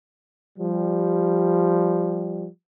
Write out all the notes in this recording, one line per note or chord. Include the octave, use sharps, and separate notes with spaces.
F3 G3